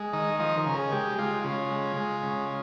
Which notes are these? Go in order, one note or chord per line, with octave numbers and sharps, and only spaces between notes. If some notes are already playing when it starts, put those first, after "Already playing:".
Already playing: G#3
D#3 D#5
F3 D#5
A#4
C#3
G#4
G#3 G4
G#3 F4
C#3 F4
G#3
G#3
C#3